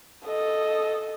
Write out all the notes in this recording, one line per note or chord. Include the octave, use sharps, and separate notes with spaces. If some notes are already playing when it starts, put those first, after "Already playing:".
A4 D#5